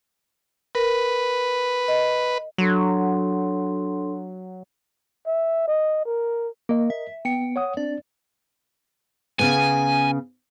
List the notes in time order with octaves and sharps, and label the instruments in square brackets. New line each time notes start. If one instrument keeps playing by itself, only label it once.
[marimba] A#4 [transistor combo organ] B4
[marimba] D#5
[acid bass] F#3 [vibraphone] D4 A4 C6
[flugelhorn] E5
D#5
A#4
[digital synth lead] A#3 [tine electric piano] A#4 D#5
[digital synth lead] E5
[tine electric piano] B3 C#7 [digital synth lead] G5
[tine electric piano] C#5 F#5 D#6
[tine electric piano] C4 D4 [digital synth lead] D5
[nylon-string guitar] C#3 B3 [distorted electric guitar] G#5